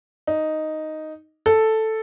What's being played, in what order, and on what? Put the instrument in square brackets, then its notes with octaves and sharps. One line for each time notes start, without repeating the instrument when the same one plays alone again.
[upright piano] D#4
A4